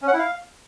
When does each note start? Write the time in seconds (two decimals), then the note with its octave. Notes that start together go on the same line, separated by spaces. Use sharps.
0.02 C#4
0.08 F#5
0.13 E4
0.19 F5